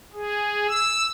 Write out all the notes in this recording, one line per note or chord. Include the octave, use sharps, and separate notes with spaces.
G#4
E6